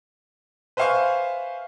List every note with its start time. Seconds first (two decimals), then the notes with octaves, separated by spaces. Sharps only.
0.77 B4 C5 E5 F5 G#5 C#6